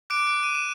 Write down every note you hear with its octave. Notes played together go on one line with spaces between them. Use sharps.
D6 F#6 D7
D7
D#7
E7